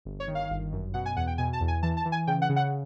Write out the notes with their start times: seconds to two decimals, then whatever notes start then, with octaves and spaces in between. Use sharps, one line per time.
0.05 G1
0.20 C#5
0.28 D#3
0.35 F5
0.50 G1
0.72 F#2
0.94 B2 F#5
1.06 G#5
1.16 E2 F#5
1.27 G5
1.38 B2 G#5
1.53 A5
1.61 E2
1.68 G#5
1.83 E3 A5
1.97 A5
2.05 E3
2.12 G#5
2.27 C#3 G5
2.42 F#5
2.49 C#3
2.56 F#5